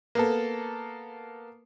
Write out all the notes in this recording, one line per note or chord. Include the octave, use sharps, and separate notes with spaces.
A#3 B3 A4